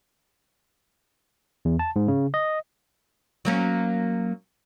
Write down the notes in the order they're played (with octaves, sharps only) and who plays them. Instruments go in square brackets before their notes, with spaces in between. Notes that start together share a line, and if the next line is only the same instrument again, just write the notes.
[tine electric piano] E2
A5
G#2
C#3
D#5
[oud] F#3 A#3 C#4